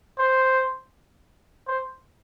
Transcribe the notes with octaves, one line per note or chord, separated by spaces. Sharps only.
C5
C5